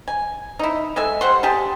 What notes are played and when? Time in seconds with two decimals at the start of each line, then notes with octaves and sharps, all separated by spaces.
0.08 G#5
0.59 D#4 E4
0.96 G#3 A4 E5 G#5
1.21 G3 C5 F#5 C6
1.43 G4 G#4 A5